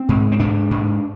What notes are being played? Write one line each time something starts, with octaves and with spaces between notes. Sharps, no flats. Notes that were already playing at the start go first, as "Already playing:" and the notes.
Already playing: C4
G#2
C4
G#2 D4
G#2